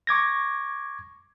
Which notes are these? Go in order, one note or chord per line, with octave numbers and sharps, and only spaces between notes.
C#6 D6 G#6 A#6